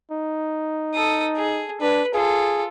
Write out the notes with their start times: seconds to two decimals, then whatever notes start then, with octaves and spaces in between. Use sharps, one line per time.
0.11 D#4
0.94 A4 D#6
1.36 G#4
1.81 D4 B4
2.14 F4 G#4 A4